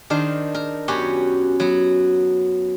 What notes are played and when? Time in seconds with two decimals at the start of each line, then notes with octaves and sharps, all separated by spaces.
0.10 D#3 D4 A#4 C5
0.55 A#4
0.88 F#2 B3 C#4 F#4 G4 C#5
1.60 F#3 B3